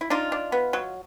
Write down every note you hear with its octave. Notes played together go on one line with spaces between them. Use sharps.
E4
D4 D#4 F4
D4
B3
F#3